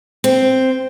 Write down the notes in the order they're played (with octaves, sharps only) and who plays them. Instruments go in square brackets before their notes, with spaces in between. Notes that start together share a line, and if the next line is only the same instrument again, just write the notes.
[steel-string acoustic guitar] C4